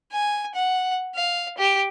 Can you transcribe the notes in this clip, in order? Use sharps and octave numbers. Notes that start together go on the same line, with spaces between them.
G#5
F#5
F5
G4